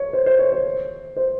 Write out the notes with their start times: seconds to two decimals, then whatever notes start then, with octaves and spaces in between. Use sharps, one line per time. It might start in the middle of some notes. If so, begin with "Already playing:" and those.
Already playing: C#5
0.13 C5
0.26 C5
0.39 C#5
0.52 C5
1.16 C5